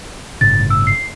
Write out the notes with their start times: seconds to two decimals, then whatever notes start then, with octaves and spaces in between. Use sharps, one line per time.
0.41 G1 A2 C#3 A6
0.70 E6
0.87 C7